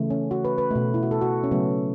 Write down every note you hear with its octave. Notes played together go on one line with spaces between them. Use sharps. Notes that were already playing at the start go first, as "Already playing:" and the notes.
Already playing: C#3 E3 A3
C#4
F#4
B4
B4
B2 A3
E4
F#4
A4
F#4
C#4
C#3 F#3 A3 B3